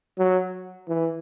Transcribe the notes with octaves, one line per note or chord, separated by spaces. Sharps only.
F#3
E3